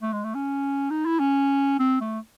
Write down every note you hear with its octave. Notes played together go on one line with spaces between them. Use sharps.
A3
G#3
A3
C#4
D#4
E4
C#4
C4
A3